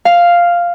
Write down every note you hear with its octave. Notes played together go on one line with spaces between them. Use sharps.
F5